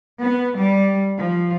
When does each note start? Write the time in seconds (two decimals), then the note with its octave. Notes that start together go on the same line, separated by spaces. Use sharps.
0.22 B3
0.56 G3
1.18 F3